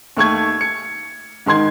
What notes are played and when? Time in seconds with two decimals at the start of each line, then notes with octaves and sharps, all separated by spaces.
0.17 D#2 A3 C#6 G#6
0.61 C#7
1.46 G#2 D#3 C6 G#6